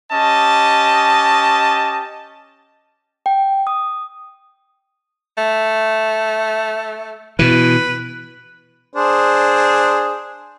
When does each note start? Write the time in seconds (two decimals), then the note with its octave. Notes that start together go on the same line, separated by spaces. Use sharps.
0.12 C#4 G4 D#5 A5
3.26 G5
3.67 D#6
5.38 A3
7.39 B2 E3 B4
8.95 D4 G#4 C5